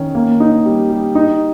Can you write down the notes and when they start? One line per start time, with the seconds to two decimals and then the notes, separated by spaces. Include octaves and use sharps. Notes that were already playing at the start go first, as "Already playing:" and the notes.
Already playing: D#3 C#4
0.15 A#3
0.40 D#4
0.65 G3
0.89 G3
1.15 D#4